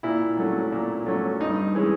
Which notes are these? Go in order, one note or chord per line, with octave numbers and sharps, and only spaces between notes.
A#2 E4
F#3 A3 C#4
A#2
F#3 A3 C#4
G2 D#4
E3 G#3 C#4